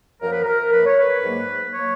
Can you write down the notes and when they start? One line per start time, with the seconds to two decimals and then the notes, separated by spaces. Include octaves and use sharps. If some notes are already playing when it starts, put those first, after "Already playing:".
0.20 F#2 F3 A#3 A#4
0.33 B4
0.44 A#4
0.72 F#2 F3 A#3 B4
0.86 C#5
1.00 B4
1.22 G#2 F#3 A#3
1.74 F#3 A#3 C#5